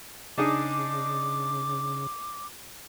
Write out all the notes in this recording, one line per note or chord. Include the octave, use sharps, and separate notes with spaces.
C#3 D4 D#4 G#4 D6